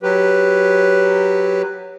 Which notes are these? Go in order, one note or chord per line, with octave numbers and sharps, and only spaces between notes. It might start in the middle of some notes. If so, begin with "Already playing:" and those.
F#3 G4 B4